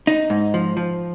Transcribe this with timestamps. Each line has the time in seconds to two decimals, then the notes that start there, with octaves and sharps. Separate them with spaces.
0.07 D#4
0.30 G#2
0.54 F3
0.77 F3